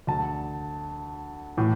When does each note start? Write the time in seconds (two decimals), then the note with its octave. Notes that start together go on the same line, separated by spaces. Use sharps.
0.07 D2 D3 A5
1.57 A2 E3